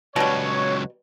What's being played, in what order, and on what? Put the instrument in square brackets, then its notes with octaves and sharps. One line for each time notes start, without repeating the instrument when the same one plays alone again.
[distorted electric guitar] C#2 F#3 [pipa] B2 G3 [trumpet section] C#5